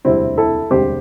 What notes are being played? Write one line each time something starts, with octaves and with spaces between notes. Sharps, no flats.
E1 D2 C3 G3 C4 E4
E4 A4
E1 D2 C3 G3 G4 C5